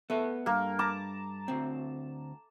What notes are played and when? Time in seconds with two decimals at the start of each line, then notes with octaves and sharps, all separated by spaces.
0.10 A3 B3 B4 E5
0.46 G2 A#3 A#4
0.79 A5 A#5 D6
1.48 D2 C4